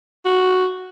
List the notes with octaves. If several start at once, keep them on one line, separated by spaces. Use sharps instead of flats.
F#4